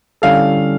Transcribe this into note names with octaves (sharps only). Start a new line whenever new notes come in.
D3 G3 C#4 E4 A4 F5